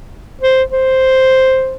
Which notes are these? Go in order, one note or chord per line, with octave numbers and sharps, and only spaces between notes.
C5
C5